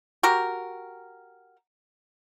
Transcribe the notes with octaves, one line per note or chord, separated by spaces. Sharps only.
F#4 G4 A#4